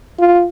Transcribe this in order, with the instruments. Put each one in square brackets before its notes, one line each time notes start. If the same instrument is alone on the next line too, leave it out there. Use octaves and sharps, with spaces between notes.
[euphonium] F4